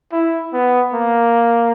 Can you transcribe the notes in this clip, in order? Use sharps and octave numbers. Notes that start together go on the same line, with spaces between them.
E4
B3
A#3